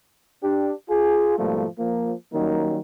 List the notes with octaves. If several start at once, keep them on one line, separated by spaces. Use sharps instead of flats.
D4 G4
F4 G#4
G#2 B2 F3 G3 A3 A#3
F3 A#3
D#3 F#3 G3 A#3 C#4 D#4